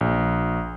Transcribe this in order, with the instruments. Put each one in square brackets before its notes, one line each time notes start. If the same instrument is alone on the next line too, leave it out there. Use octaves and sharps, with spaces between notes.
[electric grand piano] A#1